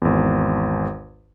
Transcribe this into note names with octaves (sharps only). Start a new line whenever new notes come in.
G#1 E2